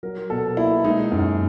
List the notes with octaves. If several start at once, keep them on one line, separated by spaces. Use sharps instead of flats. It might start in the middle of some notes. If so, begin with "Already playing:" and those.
F#3 A#4
B2 A4
A#3 E4
G#3 D#4
F#2